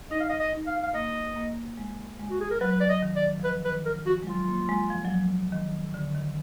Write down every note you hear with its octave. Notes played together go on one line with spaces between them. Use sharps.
D#4 D#5
F5
D#5
D#5
D#4
F5
F5
A#3 D#5
A#3
G#3
G#3
F#4
G#4
A#4
F#3 B4
B4
D5
D#5
D#3
D5
F3
D#3 B4
D#3 B4
D#3 A#4
F3 F#4
G#3
F#3 F4
A#3
G#3
F3
F#3
F3
D#3
D3
D#3